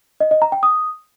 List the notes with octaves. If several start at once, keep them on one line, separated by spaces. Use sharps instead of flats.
D#5
D#5
A#5
G5
D#6